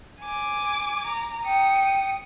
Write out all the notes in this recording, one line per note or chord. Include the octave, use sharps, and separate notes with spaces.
G#5 D6
A#5
G5 D#6 C#7